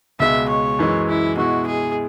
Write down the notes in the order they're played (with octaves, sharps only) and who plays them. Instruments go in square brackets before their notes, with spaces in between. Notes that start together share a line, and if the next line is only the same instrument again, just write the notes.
[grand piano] C#2 B2 G#3 [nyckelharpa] E5
[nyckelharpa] C#5
[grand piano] F#2 E3 G#3
[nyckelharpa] E4
[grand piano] B2 G#3 E4 [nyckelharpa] F#4
[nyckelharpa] G#4